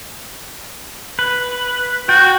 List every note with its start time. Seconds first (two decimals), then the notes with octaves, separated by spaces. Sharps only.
1.19 B4
2.09 F#4 G5